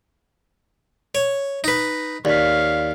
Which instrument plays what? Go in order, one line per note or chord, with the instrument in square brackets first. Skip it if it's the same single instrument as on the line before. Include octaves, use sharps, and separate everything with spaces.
[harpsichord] C#5
D#4 B4
[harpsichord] D#2 [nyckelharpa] C#5 F5 [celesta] D5 B6